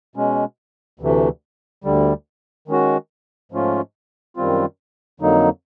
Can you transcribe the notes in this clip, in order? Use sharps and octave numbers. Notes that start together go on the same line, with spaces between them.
B2 G#3 C#4
D2 C3 E3 A3
D2 D3 G3
D#3 G#3 C#4 F#4
G#2 F3 A3 C#4 F4
F#2 D#3 G3 C4 F4
F2 D3 F#3 A#3 D#4